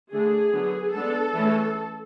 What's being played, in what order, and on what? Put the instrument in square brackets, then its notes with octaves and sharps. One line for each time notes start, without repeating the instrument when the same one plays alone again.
[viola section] D3 A3 D4 G#4
D3 F#3 B3
G#3 B3 D4 A4
E3 A3 C#4